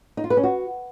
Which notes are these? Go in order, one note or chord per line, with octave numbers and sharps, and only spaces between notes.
D#4
F4
B4
C#4
F#4